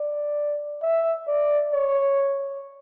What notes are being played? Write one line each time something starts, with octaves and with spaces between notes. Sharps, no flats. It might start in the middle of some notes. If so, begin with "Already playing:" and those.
Already playing: D5
E5
D5
C#5